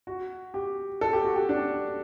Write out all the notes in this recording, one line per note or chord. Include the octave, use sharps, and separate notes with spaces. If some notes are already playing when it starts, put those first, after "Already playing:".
F#4
G4
A4
G4
F#4
G4
D4